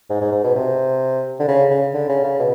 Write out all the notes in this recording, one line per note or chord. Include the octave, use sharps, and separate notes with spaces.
G#2
G#2
G#2
B2
C3
D3
C#3
C#3
D3
C#3
C#3
B2